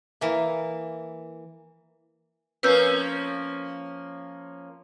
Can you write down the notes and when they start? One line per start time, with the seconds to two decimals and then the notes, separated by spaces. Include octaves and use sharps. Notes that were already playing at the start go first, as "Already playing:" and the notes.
0.21 E3 A#3
2.63 F3 A#3 C#4 B4 E6 G6